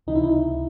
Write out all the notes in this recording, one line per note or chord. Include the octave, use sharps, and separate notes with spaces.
C#2 C3 E3 D#4
E4
D#4